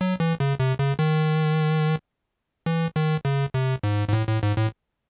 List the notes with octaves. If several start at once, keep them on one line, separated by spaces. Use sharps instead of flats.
F#3
E3
C#3
C3
C#3
D#3
E3
D#3
C#3
C3
G#2
G#2
A2
A2
G#2
A2